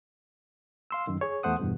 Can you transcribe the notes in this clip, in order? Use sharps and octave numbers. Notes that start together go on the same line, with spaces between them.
F5 C6 E6
F#2 D#3
G#4 C#5
E2 A3 C5 F#5 D#6
E2 G2 B2